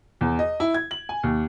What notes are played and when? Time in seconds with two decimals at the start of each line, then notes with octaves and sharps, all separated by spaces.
0.21 E2
0.39 D#5
0.60 E4
0.74 G#6
0.91 F#7
1.09 G#5
1.23 D#2